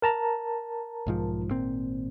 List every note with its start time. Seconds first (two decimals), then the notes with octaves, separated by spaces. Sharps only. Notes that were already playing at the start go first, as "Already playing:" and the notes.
0.02 A#4 A5 A#5
1.06 B1 G#2 F3
1.50 G#1 A#2 C4